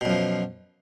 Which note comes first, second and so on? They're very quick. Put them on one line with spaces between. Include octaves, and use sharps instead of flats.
B2 F#2 F3